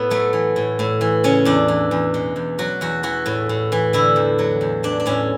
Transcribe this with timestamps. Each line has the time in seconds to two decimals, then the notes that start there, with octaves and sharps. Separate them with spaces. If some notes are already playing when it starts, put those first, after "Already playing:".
Already playing: A2 B3
0.10 F#3 A3
0.33 E3
0.56 A2
0.79 A2
1.01 E3
1.24 C#3 C#4
1.45 E2 D4
1.68 E3
1.91 E2
2.14 B2
2.36 E2
2.59 F#3 F#4
2.81 E2 F#4
3.03 E3 F#4
3.26 A2
3.49 A2
3.72 E3
3.93 D3 E4
4.16 E2
4.39 F#3
4.61 E2
4.83 E3 D4
5.00 D4
5.06 A2 C#4